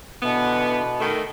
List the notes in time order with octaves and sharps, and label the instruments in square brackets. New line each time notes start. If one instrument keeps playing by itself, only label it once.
[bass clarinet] B2 [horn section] D3 E3 B3
[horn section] D#3 A3